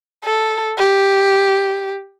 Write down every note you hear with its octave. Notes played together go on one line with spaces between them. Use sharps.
A4
G4